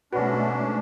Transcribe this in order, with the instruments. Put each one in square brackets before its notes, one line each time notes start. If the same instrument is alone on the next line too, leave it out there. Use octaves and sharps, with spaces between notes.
[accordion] G#2 C#4 D4 [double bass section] B2 A3 [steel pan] F#4 B4